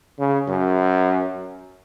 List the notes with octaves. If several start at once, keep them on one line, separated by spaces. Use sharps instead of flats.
C#3
F#2